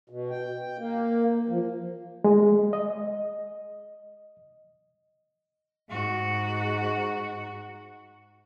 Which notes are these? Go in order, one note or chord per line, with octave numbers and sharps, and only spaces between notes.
B2
G5
A#3
F3
G#3
D#5
G#2 F#4